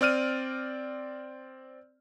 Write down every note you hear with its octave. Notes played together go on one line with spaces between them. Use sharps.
C4 D5 F6 D#7